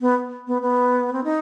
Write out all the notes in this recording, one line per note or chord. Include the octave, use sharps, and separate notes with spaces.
B3
B3
B3
C4
D#4